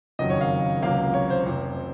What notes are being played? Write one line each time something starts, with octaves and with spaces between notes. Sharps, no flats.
F#1 F2 D#3 F#3 D#5
C#5
F5
C#2 C3 F#3 A#3 F5
C#5
C5
F1 F2 C3